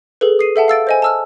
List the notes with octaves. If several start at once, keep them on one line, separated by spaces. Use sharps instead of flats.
G#4 A4 B4
D#6 C7 D#7
A4 E5 F#5 A5
F5 E6 A6 D7
C5 D#5 G#5
A5 E6 F6